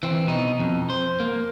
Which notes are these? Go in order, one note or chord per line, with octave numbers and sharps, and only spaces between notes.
E3 C4
B2 D#4
F2
C5
A#3